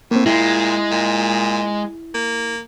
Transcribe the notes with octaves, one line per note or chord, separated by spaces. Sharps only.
A2 A#3 C4
A#2 G#3 E4
A#2
A#3